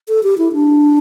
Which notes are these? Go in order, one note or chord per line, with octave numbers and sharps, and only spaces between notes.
A4
G4
E4
D4